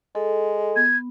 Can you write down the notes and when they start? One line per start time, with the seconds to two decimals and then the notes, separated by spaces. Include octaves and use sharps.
0.15 G#3 A4
0.76 B3 G#6